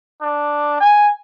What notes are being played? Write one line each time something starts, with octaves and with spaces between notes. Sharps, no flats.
D4
G#5